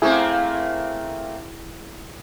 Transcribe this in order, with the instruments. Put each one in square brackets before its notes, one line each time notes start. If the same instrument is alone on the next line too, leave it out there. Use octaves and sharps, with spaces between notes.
[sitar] A3 A#3 C4 [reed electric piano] E4 G#4